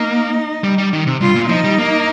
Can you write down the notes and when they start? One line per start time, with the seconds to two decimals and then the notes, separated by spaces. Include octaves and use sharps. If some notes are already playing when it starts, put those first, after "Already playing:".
Already playing: A#3 D#4
0.64 G3
0.78 G3
0.93 D#3
1.07 C3
1.21 G2 F4
1.35 A#2
1.49 F3 D#4
1.64 G3
1.78 A#3